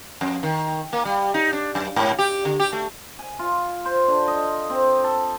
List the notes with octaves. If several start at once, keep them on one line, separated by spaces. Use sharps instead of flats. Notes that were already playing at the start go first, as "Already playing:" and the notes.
F2
D#3
A#3
G3
D#4
D4
F#2
G#2
G4
D3
G4
A3
G#5
F4
C5
D3
D#5
C4
A4